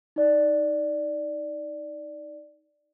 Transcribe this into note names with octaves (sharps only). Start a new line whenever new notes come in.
D#4 D5